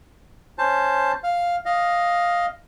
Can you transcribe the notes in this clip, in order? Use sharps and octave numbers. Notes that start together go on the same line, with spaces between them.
C#4 C5 A5
F5
D#5 F5